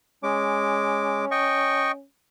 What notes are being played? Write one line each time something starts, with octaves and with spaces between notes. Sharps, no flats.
G#3 C#4 D6
D#5 G5 C#6